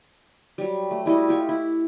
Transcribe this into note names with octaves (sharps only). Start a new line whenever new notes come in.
F#3 G3
A3
G3 E4 F#4 D#5
F4 G4 C#6
E4